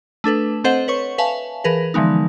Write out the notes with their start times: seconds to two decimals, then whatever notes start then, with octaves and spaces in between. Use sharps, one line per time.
0.24 A3 D4 A4 B4
0.64 C4 A4 C5 D#5 F#5
0.88 B4 C#5 C#6
1.18 B4 E5 F5 G#5 A5
1.64 E3 G#4 A#4 B4
1.94 D3 E3 F3 G#3 B3 D#4